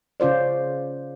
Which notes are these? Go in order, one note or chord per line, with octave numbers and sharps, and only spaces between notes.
C#3 C#4 F4 C5 D5